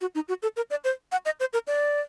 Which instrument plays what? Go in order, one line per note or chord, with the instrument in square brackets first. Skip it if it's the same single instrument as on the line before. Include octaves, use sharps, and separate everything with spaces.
[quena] F#4
D#4
F#4
A4
A#4
D5
C5
F#5
D#5
C5
A#4
D5